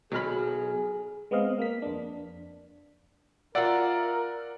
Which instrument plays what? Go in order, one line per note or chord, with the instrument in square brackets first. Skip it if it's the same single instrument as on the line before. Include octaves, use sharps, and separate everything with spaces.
[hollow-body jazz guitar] B1 B5 [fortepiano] F#3 F6 [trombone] G#4
[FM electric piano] G#3 B3 C4 D#5 F5
A#3 B6
F2 D4
[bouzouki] F4 E5 [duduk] A#4 [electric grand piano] D5 F#5